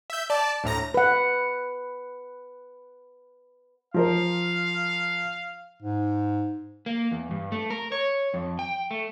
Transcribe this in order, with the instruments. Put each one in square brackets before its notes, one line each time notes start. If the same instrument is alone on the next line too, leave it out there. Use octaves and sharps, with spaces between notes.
[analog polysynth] E5 G6
D5 A5
D2 A2 A#5 A#6
[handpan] B4 F#5
[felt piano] F3 A#4 C5 [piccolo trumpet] F5
[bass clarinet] G#2
[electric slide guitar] A#3
E2
G2
A3
A#4
C#5
F2
G5
A3